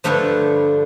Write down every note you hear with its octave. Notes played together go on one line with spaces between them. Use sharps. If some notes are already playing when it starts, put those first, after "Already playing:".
G2 D3 F3 A3